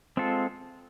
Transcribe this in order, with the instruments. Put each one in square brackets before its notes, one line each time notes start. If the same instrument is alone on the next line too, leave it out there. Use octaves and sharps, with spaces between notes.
[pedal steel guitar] G#3 C4 F4 A4